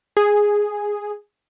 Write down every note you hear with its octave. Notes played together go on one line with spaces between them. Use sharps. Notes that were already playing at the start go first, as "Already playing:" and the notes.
G#4